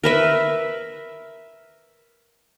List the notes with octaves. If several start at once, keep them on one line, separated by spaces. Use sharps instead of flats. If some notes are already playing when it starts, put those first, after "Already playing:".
A#4 B4 E5